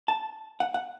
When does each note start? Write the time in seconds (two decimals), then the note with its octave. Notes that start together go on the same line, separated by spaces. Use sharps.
0.08 A5
0.60 F#5
0.74 F#5